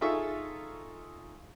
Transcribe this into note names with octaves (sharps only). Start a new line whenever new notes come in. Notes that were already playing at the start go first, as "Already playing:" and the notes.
D#4 F4 G#4 A4 E5 C#6